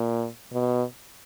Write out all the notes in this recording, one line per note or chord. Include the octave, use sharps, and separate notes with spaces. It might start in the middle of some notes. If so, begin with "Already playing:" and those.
Already playing: A#2
B2